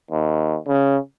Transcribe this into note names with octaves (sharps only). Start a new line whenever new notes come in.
D#2
C#3